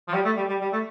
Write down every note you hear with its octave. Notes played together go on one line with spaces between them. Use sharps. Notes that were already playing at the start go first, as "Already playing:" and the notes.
F3
G3
A3
G3
G3
G3
A3